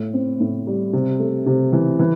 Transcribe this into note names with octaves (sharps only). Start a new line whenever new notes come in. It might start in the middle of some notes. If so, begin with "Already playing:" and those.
Already playing: A2
C4
A2
G3
C3
A3
C3
E3
E3